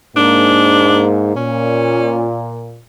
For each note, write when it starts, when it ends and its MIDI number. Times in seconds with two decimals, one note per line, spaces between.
0.16 1.32 44
0.16 1.32 58
0.16 1.06 62
1.36 2.83 46
1.36 2.30 61